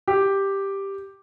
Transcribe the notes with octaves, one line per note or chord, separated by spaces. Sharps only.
G4